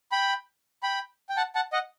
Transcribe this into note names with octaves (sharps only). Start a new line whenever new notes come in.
G5 B5
G5 B5
G5
F#5 A5
F#5 A5
D#5 F#5